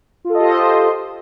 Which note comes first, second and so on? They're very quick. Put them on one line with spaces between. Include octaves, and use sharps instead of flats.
F4 A4 D#5 G4 C5